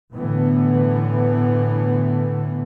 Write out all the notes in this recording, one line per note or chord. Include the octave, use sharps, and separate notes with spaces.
A2 D3 E3 B3